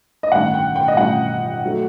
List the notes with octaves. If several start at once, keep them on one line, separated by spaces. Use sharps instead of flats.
D#5
A1 G2 D#3 F#5
G5
G5
D#5
A1 G2 D#3 F#5
F#3 A3